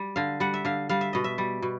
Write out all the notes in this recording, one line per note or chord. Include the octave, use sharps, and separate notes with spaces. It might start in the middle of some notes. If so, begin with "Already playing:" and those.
Already playing: G3
D3 F5
G3 F#5
E5
D3 F5
G3 F5
E5
B2 D#5
E5
G3
B2